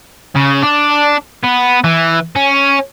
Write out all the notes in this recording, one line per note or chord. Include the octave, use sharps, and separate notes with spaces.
C#3
D4
B3
E3
C#4